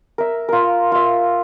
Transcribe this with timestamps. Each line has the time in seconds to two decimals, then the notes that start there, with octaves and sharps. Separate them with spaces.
0.18 A#4 E5
0.49 F4 A#4
0.92 F4 E5